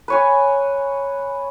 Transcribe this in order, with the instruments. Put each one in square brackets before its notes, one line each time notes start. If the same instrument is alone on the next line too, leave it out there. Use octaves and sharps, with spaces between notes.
[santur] B4 C#5 G#5